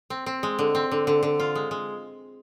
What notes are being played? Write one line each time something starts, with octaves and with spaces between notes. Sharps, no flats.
C4
C4
G#3
D3
C4
D3
D3
D3
F4
G#3
G#3